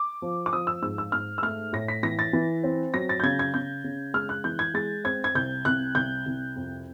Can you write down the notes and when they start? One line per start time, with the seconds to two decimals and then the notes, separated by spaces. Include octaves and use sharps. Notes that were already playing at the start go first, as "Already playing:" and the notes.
Already playing: D6
0.22 F3
0.46 D6
0.53 F3 D#6
0.67 E6
0.82 G#2 E6
0.98 E6
1.12 G#2 F6
1.38 E6
1.42 A3 F6
1.73 A2 A#6
1.88 B6
2.03 E3 A#6
2.19 A6
2.33 E3
2.64 C4
2.94 F#3 A#6
3.09 A6
3.20 G6
3.23 C#3 G#6
3.39 G#6
3.54 C#3 G6
3.84 C#3
4.14 G#3 F6
4.29 F#6
4.44 E3 G6
4.59 G#6
4.74 G#3 A6
5.04 C4 G#6
5.24 G#6
5.35 C2 G6
5.65 C2 F#6
5.95 C2 G6
6.26 C2
6.56 F2